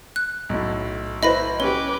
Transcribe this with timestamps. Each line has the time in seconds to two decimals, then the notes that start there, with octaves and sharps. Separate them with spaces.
0.16 F#6
0.49 B1 A2
1.23 E4 B4 C5 D#5 B5 A#6
1.60 C#4 G4 B4 D6 G7